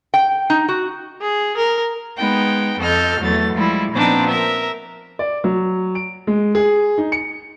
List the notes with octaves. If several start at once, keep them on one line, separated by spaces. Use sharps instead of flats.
G5
D#4
F#4
G#4
A#4
G#3 B3 D#4 G5
F2 A4 D#5 F6 G6
E2 F#3 A3 A6
F3 G3 G#3 E4
A#2 F3 B3 C4 D4 D#4
A#4 E5
D5
F#3
D7
G#3
G#4
D#4
C#7